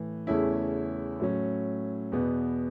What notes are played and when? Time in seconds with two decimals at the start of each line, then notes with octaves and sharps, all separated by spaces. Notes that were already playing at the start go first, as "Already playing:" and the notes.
Already playing: A2 E3
0.27 E2 C#3 A3 C#4 E4
1.20 A2 F#3 C#4
2.12 E2 B2 B3